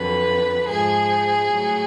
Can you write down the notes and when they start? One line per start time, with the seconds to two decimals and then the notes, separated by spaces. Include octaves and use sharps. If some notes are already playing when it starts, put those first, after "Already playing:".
Already playing: F2 D3 F#3 B4
0.68 G#2 F3 G#4
1.49 A2 F#3